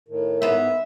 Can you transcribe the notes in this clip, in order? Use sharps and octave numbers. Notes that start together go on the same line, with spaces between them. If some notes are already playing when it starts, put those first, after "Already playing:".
A2 D#3
G#2 B3 E5